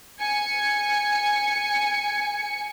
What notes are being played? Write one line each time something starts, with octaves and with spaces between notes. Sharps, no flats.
G#5 C#7